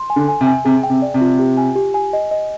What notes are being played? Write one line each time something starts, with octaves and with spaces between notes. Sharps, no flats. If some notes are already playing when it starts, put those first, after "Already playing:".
Already playing: C6
G#5
D3
G#5
C3
G#5
C3 G#4
G5
C3
D5
C3
F4
G4
G#5
G4
G#5
D#5
D#5